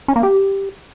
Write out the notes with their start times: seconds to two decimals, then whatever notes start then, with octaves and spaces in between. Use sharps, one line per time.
0.08 C#4
0.16 A#3
0.23 G4